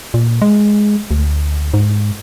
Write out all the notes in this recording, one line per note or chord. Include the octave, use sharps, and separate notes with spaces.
A#2
G#3
D2
G#2